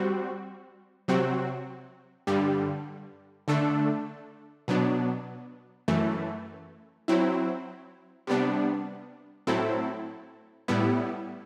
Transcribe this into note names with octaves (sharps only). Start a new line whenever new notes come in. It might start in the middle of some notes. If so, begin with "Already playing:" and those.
Already playing: G3 C4 F#4
C3 F#3 C4 F#4
G2 D3 G3
D3 A3 D4 A4
B2 F#3 B3 D4
F#2 E3 A3
F#3 C4 E4
C3 G3 B3 D4
A2 F#3 C4 E4 A4
A2 G3 B3 E4